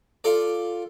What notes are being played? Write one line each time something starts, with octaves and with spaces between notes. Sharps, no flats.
F4 A4 D5